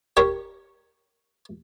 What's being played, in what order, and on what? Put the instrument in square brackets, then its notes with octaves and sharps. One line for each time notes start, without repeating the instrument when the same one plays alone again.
[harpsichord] G4 A#4 C#5